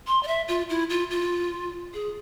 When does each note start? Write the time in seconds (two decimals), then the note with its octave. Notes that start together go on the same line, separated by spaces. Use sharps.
0.07 C6
0.23 D5
0.27 E5
0.48 F4
0.69 E4
0.90 F4
1.11 F4
1.94 G#4